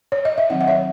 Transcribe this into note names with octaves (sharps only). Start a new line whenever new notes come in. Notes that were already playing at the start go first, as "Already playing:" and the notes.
C#5
D#5
E5
D#3 F#3 C4 D#4 D#5 F#5
F#5
C#5 E5